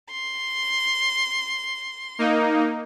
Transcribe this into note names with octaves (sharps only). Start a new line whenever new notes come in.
C6
A#3 D#4